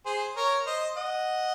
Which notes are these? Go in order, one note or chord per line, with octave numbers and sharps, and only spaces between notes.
G#4 C5
A#4 C#5
C5 D#5
D#5 F#5